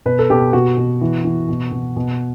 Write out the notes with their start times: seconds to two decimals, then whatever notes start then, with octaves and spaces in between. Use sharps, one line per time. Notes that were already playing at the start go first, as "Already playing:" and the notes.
0.06 B2 B4
0.19 A4
0.30 B2 G4
0.53 B2 F#4
0.77 B2
1.01 E3
1.24 E3
1.48 B2
1.72 B2
1.96 B2